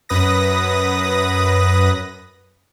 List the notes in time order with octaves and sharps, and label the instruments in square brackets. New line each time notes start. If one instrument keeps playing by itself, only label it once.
[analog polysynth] F#2 B4 D#6 A#6